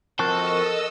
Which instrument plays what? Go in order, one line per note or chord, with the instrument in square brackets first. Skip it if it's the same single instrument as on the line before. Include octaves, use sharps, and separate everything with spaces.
[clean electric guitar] F3 C4 F#4 [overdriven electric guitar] A4 [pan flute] A#4 [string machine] D#5 E6